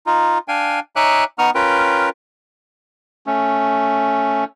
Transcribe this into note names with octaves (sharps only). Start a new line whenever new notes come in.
D#4 F4
D4 F5 G5 G#5
D#4 C#5 E5 G#5 D6 F#6
B3 D#4 C#6 D#6 F6
C#4 F4 A#4 B4 G5
A3 C#4